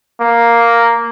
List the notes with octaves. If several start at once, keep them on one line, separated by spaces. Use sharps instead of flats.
A#3